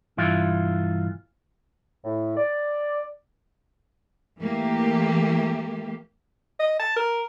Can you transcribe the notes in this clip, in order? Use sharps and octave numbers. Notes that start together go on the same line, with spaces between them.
B1 G2 E3 F4
A2
D5
E3 A3 A#3 G4
D#5
A5
A#4